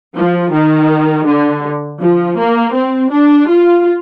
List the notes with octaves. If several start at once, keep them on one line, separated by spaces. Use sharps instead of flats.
F3
D#3
D3
F3
A#3
C4
D4
F4